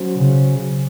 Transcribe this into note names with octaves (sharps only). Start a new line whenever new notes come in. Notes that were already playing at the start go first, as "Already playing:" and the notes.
Already playing: F#3 C#4 F#4 C5
C#3